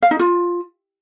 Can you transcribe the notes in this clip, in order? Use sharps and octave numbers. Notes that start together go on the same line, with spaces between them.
F5
D#4
F4